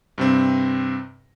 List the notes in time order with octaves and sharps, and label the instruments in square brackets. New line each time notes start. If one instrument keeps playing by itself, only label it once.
[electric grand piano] G2 C3 C4